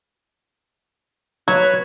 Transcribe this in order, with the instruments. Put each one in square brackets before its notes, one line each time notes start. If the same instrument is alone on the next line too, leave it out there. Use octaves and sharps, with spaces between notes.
[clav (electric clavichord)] F#3 [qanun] F#4 [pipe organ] B4 C#5 [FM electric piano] G#6